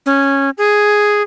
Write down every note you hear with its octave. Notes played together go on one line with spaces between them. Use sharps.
C#4
G#4